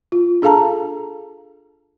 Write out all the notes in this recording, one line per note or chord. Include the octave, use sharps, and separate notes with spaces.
F4
D4 G#4 A4 F5 A5 A#5